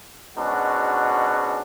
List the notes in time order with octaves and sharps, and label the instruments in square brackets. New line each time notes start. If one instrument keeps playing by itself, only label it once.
[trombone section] G#2 B2 G#3 C#4 D4 F#4